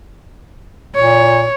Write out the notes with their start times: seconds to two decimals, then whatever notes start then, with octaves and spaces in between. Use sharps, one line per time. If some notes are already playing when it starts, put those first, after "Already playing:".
0.95 A#2 C#5